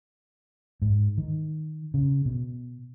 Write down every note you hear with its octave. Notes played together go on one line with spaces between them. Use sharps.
G#2
D#3
C#3
B2